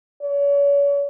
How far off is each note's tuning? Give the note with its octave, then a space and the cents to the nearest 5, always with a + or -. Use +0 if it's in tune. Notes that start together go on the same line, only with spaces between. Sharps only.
C#5 +40